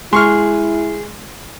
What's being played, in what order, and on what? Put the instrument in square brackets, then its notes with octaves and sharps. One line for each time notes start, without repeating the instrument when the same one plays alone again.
[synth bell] G#3 [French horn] E4 [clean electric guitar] G#4 [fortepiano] C6 C#6 F6